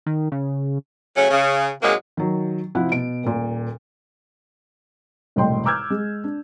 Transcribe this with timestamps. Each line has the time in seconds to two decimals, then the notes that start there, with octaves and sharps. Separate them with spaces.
0.06 D#3
0.32 C#3
1.16 C#3 F#3 A3 C#4
1.30 C#3
1.82 G#2 C3 F#3 G#3 A#3
2.17 D#3 F#3
2.75 C3 F3 E4 F#5
2.92 B2 D7
3.24 D#1 A#2
5.36 E1 C2 A2 D#5 G5 C6
5.65 A#5 D6 E6 F6 G6 G#6
5.90 G#3
6.24 D4